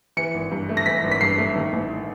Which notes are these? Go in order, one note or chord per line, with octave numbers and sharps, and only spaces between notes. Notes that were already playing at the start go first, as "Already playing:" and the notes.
E3 C#7
G#1
G2
A3
A#6
E3 B6
G#1
B6
G2 C7
A3
D#3
A1